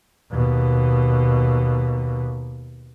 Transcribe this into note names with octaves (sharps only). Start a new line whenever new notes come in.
D#2 B2